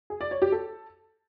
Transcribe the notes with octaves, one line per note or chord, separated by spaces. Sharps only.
G#4
D5
C#5
G4
A4